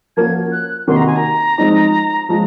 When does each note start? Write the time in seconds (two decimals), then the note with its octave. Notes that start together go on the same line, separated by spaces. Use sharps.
0.17 F3 A#3 C#4 F#4 G#6
0.52 F#6
0.87 C3 D#3 A#3 D#4 F#4 C6
0.97 A#5
1.07 G#5
1.16 A#5
1.58 F3 G#3 C4 D#4
2.29 F3 G#3 C#4 F4